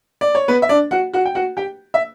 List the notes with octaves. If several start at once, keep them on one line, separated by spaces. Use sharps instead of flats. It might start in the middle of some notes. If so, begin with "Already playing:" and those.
D5
C#5
B3 B4
E5
D4 D5
F#4 F#5
F#4 F#5
G5
F#4 F#5
G4 G5
E5